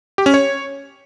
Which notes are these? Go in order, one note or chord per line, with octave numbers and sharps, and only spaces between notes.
G4
C#4
C#5